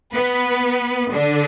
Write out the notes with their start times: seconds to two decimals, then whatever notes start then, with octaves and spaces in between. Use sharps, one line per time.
0.13 B3 B4
1.12 D3 D4